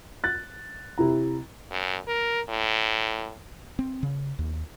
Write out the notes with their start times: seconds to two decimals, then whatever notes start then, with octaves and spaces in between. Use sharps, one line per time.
0.24 F#6 A6
0.98 C3 E4 A#5
1.71 F#2
2.07 A#4
2.49 A2
3.79 C4
4.03 C#3
4.39 D#2